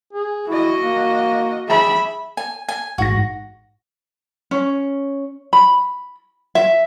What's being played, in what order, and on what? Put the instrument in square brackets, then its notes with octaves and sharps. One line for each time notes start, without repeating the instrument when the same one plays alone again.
[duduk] G#4
[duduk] E4 [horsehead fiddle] F#4 D#5
[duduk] A#3
[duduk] G#4 [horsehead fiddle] E5 B5
[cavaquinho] G#5
G#5
[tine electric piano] A1 G#2 A#6 [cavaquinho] F#4
[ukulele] C#4
B5
E5